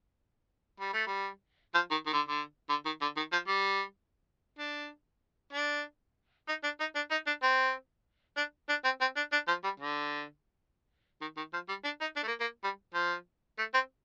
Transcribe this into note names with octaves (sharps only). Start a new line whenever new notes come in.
G3
A3
G3
F3
D#3
D#3
D3
D3
D3
D#3
D3
D#3
F3
G3
D4
D4
D#4
D4
D#4
D4
D#4
D4
C4
D4
D4
C4
C4
D4
D4
F3
G3
D3
D#3
D#3
F3
G3
D4
D#4
D4
A3
A#3
A#3
G3
F3
A3
C4